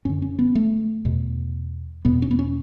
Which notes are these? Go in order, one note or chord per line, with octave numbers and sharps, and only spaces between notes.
F#2 D3 C#4
C#4
B3
A3
E2 B2
E2 B2 B3
C#4
B3
C#4